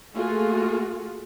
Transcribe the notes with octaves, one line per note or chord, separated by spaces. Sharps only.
A3 A#3 F4 F#4 G#4